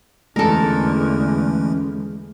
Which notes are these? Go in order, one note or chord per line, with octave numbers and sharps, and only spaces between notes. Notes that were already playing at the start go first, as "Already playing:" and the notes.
E2 D3 E3 G#3 A3 C#4 A4 A#4